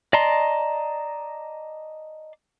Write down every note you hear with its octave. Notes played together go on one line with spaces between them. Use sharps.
D5 D#5 A5 A#5 C6